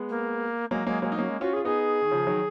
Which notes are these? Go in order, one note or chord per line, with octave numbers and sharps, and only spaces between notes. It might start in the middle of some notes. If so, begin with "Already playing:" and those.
Already playing: G#3 B3
A#3
F#3 G#3 A#3
F#3 G#3 A#3
F#3 G#3 A#3
D#4
F#3 A#3 C#4
G#3
C#4 F4 F#4
G#4
F4
B3 D#4 G#4
D#3
C#3 F3
D#3 F#3